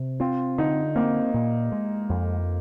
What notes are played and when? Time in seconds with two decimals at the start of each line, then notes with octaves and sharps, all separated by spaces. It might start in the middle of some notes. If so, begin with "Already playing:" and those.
Already playing: C3
0.20 C4 F4
0.58 D3 D#4
0.96 A#3 C4
1.34 A#2
1.72 G#3
2.09 F2